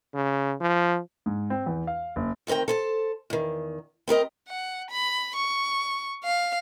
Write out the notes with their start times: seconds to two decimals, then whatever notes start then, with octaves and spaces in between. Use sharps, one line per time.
0.14 C#3
0.61 F3
1.26 G#2
1.50 C4
1.66 E2
1.87 F5
2.16 F#1
2.47 D2 D#3 C4 A#4 G5
2.68 A4 C5 A5
3.30 E2 D#3
4.08 C4 G4 A#4 D#5
4.48 F#5
4.90 B5
5.36 C#6
6.24 F5